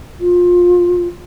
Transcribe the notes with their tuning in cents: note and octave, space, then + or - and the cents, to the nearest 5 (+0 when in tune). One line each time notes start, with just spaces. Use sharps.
F4 +20